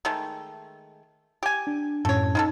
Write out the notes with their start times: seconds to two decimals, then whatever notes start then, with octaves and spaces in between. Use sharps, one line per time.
0.05 D#3 G#3 A3
1.43 G4 G#5
1.67 D4
2.05 F#2 A2 C#4 A4 C#5
2.35 C#4 D#4 F4 A4